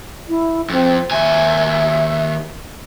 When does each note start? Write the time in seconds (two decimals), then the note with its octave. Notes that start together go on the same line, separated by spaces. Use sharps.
0.28 E4
0.70 F2 C4
1.11 D#2 E5 G#5